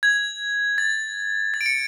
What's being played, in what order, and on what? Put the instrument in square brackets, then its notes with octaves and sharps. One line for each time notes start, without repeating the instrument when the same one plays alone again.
[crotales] G#6
A6
A6
D7
C#7